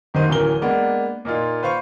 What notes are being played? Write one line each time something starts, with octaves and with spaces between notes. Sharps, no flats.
C2 D#3 D#4 C5 D#7
D1 E3 C#4 A#4 G7
G#3 A#3 B3 D4
A#2 A#3 D#4 F4
B4 C5 F5 C#6